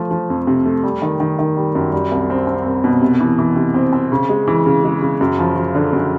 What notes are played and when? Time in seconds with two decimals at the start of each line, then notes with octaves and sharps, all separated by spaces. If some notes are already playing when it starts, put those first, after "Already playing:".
Already playing: F3 A3
0.11 F3
0.30 F2
0.47 C3
0.66 A3
0.83 G3
1.02 D#3
1.20 D#3
1.39 D#3
1.57 G3
1.75 F#2
1.93 G3
2.12 C2
2.30 C4
2.47 C4
2.66 C2
2.84 B2
3.01 C3
3.20 E3
3.39 E3
3.56 C3
3.74 C4
3.93 C4
4.12 C#3
4.29 G#3
4.48 E3
4.66 C#3
4.84 G#3
5.02 C#3
5.21 F#2
5.39 F3
5.56 F3
5.75 D3
5.93 F#2